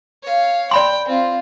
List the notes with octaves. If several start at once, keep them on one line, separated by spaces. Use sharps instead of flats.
C#5 F5
D5 G5 B5 C6
C4 F4